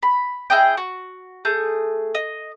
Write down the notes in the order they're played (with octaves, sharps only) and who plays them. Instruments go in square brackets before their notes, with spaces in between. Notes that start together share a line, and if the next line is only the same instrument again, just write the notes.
[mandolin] B5
E4 G#4 D#5 G5
F#4
A3 G#4 G6
D#5